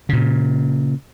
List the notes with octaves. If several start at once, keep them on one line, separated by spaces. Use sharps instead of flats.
A#2 C#3